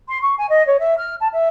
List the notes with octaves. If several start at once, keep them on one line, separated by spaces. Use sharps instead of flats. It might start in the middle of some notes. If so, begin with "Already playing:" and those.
C6
C#6
G#5
D#5
C#5
E5
F6
A5
E5